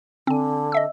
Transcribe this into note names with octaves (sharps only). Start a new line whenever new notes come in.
D3 C4 G#5
D#5 E5 E6